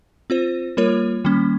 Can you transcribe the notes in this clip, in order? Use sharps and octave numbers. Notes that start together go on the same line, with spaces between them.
C4 F4 C5
G3 A#3 F4 A#4 C#5
D#3 G3 A#3 C#4